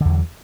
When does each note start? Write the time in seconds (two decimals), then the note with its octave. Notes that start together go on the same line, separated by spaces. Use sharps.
0.01 D3
0.05 E2
0.09 F#3